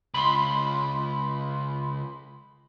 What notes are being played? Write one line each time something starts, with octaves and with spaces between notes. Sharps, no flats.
C#2 B5 C6